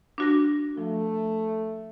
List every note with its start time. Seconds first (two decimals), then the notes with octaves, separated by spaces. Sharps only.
0.18 D4 F#4 A#6
0.77 F3 A3